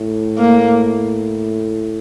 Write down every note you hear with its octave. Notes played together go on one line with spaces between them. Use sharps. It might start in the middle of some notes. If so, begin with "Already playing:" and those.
Already playing: A2
A#3